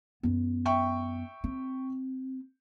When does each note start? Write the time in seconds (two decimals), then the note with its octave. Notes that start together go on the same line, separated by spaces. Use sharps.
0.23 F#2 B3
0.65 E5 G5 C#6
1.44 C4